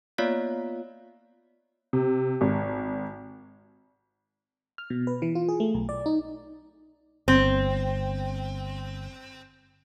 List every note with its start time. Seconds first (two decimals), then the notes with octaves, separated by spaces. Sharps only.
0.18 A#3 B3 F4 C#5 D5 F5
1.93 C3
2.41 G#1
4.78 F6
4.90 B2
5.07 B4
5.22 E3
5.35 F4
5.49 G#4
5.60 A3
5.75 B1
5.89 D5
6.06 D#4
7.28 G1 C4